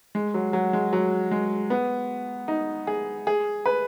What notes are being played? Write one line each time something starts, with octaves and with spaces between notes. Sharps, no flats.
G#3
F#3
F#3
G#3
F#3
G#3
B3
D#4
G#4
G#4
B4